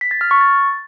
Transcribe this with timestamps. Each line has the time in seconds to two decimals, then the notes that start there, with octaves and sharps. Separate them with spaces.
0.01 B6
0.11 A6
0.21 F6
0.31 C#6
0.41 A6